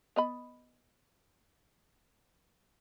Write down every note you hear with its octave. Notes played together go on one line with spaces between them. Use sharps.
B3 D#5 B5